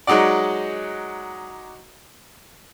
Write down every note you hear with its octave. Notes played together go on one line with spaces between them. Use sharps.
F#3 G#3 D#4 F#4 D5